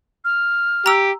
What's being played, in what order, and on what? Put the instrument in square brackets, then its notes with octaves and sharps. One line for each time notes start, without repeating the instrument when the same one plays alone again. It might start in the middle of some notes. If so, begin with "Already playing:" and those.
[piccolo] F6
[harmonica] G4 [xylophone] A#5 E6